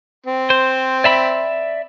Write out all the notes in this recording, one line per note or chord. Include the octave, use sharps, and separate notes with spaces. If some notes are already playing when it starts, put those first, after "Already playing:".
C4
C5
D5 E5 B5